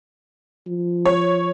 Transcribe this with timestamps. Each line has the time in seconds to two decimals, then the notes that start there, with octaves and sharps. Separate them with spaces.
0.67 F3
1.06 C#5